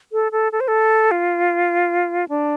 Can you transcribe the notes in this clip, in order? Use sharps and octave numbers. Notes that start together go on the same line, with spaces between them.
A4
A4
A4
C5
A4
F4
D4